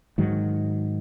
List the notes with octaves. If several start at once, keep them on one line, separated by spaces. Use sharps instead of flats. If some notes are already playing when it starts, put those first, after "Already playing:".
G#2 D#3 F#3